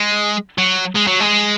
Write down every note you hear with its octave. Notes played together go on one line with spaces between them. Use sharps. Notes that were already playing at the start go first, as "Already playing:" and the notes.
Already playing: G#3
F#3
G#3
F#3
G#3